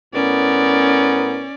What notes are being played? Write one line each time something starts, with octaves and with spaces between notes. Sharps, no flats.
A2 B3 C#4 A#4 D5